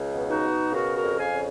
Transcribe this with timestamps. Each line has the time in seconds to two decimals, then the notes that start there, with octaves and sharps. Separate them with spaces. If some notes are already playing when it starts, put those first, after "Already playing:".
Already playing: C#2
0.13 B2
0.28 D#4 F#4
0.43 B2
0.72 C#3 F#4 A#4
0.94 F#4 A#4
1.02 F2
1.18 F5 G#5
1.32 C#3